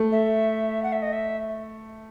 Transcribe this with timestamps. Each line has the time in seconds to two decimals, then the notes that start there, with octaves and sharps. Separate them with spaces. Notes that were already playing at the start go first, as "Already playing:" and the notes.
Already playing: A3
0.11 E5
0.82 F#5
0.92 E5
1.02 D#5
1.12 E5